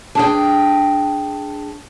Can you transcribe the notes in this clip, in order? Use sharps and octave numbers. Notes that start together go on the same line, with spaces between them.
D4 G#4 G5